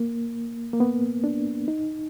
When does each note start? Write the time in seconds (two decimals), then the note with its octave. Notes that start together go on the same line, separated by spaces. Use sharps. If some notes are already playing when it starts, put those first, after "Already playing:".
Already playing: A#3
0.73 A#3
0.80 B3
1.24 D4
1.68 D#4